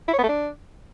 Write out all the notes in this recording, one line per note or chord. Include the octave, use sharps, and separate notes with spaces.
E4
C#5
B3
A3
D4